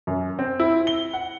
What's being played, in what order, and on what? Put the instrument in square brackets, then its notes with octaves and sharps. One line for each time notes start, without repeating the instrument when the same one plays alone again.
[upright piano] F#2
C4
E4
G7
F#5